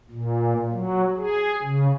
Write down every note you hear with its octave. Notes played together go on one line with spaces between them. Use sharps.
A#2
F#3
G#4
C#3